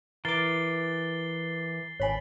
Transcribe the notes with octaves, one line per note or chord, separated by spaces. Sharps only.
E3 A#4 D6 A6 C7 G7
G#1 C#5 G#5 B5